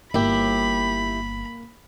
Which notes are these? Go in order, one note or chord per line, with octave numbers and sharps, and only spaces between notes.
G1 A#3 E4 G4 B5